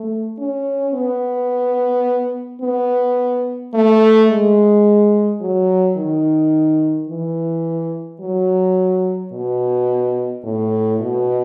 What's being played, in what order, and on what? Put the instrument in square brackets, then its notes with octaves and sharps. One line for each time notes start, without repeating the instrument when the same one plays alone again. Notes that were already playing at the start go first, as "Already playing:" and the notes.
Already playing: [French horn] A3
C#4
B3
B3
A3
G#3
F#3
D#3
E3
F#3
B2
A2
B2